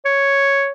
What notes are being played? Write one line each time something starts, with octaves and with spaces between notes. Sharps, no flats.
C#5